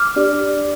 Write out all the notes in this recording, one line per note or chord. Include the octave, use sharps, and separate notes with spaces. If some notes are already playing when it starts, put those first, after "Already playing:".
Already playing: D6 F6
D4 G4 D5